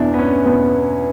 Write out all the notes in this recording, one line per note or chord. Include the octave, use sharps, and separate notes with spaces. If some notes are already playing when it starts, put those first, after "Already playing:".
Already playing: E2 B2 D4 E4
B3
C#4
E2 B2 B3